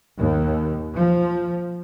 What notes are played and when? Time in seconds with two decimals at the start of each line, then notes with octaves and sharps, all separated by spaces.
0.17 D#2
0.96 F3